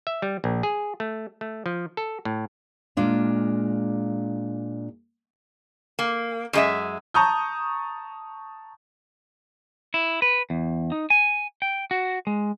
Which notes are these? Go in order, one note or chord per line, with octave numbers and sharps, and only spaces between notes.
E5
G3
A#1
G#4
A3
A3
F3
A4
A2
A#2 G#3 D4 F5
A#3
F#2 G#3 E5
A5 A#5 C#6 D#6 G6
E4
B4
E2
D#4
G#5
G5
F#4
G#3